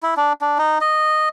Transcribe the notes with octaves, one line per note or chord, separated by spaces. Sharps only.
E4
D4
D4
D#4
D#5